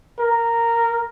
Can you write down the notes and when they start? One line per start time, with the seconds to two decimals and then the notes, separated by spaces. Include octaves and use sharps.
0.19 A#4